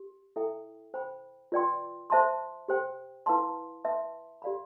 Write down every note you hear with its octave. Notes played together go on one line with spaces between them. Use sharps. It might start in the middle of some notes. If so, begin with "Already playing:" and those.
Already playing: G4
E4 A4 E5 G5
C5 G5 B5
F4 B4 D5 G5 C6
C5 E5 A5 C6
G4 C5 G5
E4 B4 F5 A5 C6
B4 E5 A5 C6
G4 D5 F5 B5